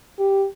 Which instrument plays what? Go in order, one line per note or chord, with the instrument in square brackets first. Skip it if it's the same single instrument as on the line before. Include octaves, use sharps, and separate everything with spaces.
[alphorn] G4